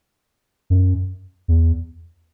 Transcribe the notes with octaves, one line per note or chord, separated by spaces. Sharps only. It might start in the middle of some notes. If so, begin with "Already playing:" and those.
F#2
E2